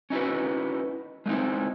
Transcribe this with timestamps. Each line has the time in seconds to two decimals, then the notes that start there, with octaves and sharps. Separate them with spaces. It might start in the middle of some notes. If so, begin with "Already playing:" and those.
0.10 C#4 D#4 E4 F#4 B4
1.26 G#3 A3 C4 D#4 E4